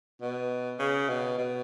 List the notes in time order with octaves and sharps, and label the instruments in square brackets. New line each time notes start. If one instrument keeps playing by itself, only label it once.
[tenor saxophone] B2
C#3
B2
B2